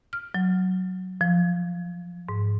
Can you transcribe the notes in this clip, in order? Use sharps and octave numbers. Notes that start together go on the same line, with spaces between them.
F6
F#3
F3
G#2